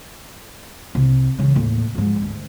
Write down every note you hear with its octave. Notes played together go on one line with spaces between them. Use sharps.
C2
C#3 E3
D#2 A2
G#2 F3
D2